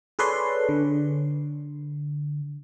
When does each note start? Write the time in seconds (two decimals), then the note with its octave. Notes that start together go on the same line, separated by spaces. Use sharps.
0.19 G#4 A4 B4 C#5 D5 C6
0.69 D3